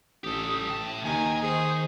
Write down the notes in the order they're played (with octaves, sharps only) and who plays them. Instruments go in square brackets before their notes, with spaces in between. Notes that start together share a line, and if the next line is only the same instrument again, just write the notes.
[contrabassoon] A1 [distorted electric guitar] G4 A4 [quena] D#6
[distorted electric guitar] A2 A5 [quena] G5
[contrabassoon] D#2 [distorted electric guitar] D#3 [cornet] G#5 [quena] A#5
[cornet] G#4 [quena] C5